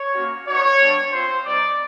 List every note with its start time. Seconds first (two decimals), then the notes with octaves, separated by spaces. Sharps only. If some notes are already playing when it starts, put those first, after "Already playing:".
Already playing: C#5
0.15 A#3 C#4 F#4
0.47 B3 D#4 F#4 C#5
0.79 G3 B3 D4
1.12 C4 F4 C5
1.44 G3 C4 D#4 D5